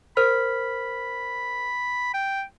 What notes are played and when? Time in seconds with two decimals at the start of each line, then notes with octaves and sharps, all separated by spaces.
0.17 A#4 C5 B5 F6
2.14 G5